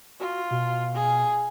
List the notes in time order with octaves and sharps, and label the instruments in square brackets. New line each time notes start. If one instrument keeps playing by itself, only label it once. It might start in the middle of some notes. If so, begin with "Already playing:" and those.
[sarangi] F4 [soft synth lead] F#4
[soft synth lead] B2
[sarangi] G#4